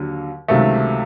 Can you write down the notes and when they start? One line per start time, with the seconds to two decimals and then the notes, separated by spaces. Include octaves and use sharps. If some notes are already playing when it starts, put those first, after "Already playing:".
Already playing: D#2 D3 F#3
0.48 C#2 C3 D#3 F#3 A3